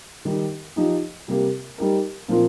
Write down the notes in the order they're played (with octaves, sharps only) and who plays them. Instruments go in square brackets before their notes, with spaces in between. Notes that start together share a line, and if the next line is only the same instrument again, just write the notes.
[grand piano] D#3 G3 D#4 G4
F3 D#4 G4
C3 G3 A#3 G4
G3 D#4 G4 A#4
A#2 F3 C4 F4 A#4